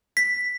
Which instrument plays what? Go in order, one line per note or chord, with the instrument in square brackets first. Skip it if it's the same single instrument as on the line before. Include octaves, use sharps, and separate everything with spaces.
[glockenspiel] B6